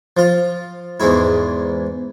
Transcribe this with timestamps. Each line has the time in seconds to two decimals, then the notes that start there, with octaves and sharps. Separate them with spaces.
0.17 F3 F4
1.00 E2 G#2 G#3 E4